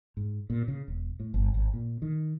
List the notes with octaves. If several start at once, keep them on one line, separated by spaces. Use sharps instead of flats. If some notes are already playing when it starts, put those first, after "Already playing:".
G#2
A#2
C#3
E1
A2
G1
G#1
A#2
D#3